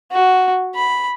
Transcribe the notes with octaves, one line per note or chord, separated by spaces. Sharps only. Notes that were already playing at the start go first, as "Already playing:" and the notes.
F#4
B5